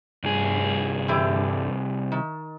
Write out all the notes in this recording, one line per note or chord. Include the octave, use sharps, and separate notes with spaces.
C2 G2 G#4
D3 E3 G4
D#3